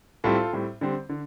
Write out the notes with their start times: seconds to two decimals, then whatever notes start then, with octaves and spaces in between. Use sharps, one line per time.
0.24 A2 G3 C4 F4 A4
0.53 A2 G3 C4
0.81 D3 G3 C4
1.09 D3